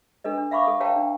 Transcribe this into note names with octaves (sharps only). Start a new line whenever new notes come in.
D4 A4 B4 D#5
D4
E5 F5 B5 C#6 D6
A4 D#6
B4 C#5 F5 G5 A5 A#5
D4